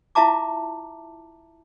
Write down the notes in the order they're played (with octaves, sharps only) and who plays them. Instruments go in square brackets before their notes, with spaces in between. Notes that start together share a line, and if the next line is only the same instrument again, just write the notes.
[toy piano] E4 F4 E5 A5 A#5 D6